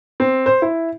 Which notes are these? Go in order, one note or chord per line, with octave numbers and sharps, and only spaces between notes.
C4
C5
E4